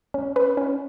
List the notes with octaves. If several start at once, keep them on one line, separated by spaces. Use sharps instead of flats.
C#4
C#4 B4
C#4